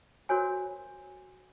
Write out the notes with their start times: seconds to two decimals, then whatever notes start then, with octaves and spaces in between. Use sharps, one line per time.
0.29 F#4 A#4 C5 C#5 G#5